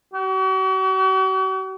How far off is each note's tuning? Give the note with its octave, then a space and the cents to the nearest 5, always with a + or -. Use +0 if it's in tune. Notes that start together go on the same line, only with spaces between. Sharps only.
F#4 +45